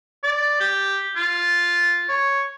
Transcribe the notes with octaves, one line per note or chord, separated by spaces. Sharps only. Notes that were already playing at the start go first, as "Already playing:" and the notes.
D5
G4
F4
C#5